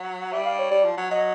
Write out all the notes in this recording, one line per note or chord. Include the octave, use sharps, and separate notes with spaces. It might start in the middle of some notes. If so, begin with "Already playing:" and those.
Already playing: F#3
G3 E5
F5
C#5
G3 D5
F3
F#3
F#3 D#5